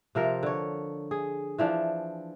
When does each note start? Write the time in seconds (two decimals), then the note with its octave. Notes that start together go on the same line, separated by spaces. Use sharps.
0.15 C3 F3 A#4
0.43 D3 C#5
1.11 G#4
1.58 E3 F3 D4